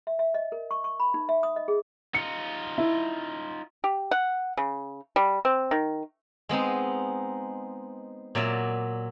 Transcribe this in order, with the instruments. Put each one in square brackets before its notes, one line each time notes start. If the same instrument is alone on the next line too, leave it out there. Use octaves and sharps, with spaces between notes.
[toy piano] E5
E5
D#5
A#4
C#6
C#6
B5
D#4
E5
D#6
D#5
G#4
[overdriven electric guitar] D#4 F4 [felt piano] C#7
[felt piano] E4
[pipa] G4
F#5
C#3
G3
C4
D#3
[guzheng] G#3 B3 C4 D#4
A#2 F#3 D5 E5